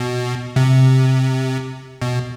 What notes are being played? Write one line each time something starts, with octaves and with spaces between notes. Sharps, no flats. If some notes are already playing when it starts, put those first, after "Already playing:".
Already playing: B2
C3
B2